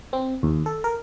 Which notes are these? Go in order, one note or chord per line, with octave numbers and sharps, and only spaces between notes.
C4
D#2
A4
A#4